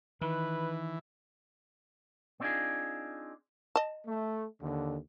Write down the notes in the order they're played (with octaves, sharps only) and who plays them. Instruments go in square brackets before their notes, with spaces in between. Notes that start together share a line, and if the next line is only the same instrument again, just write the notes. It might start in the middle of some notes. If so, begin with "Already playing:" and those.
[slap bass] D#3 [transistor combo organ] E3 [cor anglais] B4
[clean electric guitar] B3 C4 D4 D#4 F4 G#4
[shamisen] D#5 A5
[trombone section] A3
D#2 D3